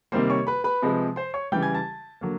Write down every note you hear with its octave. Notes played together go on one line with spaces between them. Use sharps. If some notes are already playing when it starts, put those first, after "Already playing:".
C3 D#3 G3 A#3 C5 C6
C#5 C#6
B4 B5
B4 B5
C3 F3 G#3
C5 C6
C#5 C#6
C#3 E3 G3 G5 G6
G#5 G#6
A5 A6
D3 F#3 A#3